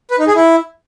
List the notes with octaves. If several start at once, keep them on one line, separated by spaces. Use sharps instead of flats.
B4
D#4
G#4
E4